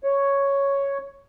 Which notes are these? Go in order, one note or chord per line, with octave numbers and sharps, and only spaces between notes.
C#5